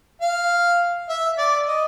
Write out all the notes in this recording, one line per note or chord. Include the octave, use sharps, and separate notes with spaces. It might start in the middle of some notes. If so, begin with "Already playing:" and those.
F5
E5
D5
D#5